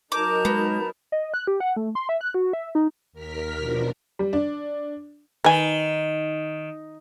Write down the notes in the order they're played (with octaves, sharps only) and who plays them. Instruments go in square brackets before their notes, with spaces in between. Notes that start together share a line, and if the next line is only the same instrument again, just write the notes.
[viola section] F#3 D#4 A#4 [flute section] A5 A#5 G6 [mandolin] D6
[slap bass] G#3 [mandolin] B3
[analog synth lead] D#5
F#6
G4
F#5
A3
C6
E5
F#6
F#4
E5
D#4
[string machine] D#2 A#4 F6 B6
B2 F3 D4 A#4
[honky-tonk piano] G3
D4
[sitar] D#3 [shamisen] B4 G#5